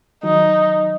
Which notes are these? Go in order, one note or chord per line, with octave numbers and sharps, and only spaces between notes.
D#3 F#3 D#4